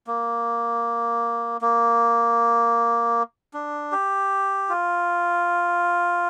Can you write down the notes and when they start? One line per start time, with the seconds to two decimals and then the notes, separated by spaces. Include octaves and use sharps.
0.07 A#3
1.61 A#3
3.54 D4
3.92 G4
4.69 F4